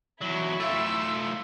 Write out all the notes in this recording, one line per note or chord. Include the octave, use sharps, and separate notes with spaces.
E2 F#3 E4 C#6
A3 F4 E6